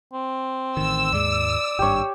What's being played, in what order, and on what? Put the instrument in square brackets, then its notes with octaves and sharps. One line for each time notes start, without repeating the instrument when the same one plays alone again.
[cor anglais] C4
[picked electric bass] A1 D#3 [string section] E6
[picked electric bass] D#2 G#2 G#3 [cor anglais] D5
[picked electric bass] G#1 G2 [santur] G4 C#5